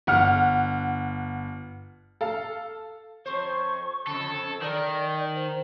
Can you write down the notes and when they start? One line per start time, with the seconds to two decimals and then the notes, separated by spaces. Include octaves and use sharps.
0.07 G1 F#5 F6
2.21 A4 F5
3.26 F2 C5 C#6
4.07 F2 C#3 A4
4.62 D#3 A#4 D5
5.35 C5